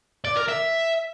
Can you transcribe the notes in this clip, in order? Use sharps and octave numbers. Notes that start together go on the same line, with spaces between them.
D5
A#4
E5